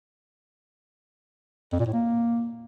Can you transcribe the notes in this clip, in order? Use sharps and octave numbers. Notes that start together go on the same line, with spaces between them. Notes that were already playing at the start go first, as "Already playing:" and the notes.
F2
A#2
A2
A#3